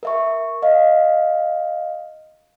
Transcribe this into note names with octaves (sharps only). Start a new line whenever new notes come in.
A#4 E5 C#6
D#5 F5